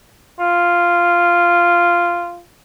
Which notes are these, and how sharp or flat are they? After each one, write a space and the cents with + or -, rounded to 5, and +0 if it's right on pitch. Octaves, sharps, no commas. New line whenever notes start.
F4 -5